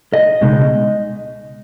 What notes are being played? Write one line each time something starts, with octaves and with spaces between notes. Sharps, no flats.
D#5
C#2 B2 G#3 D#4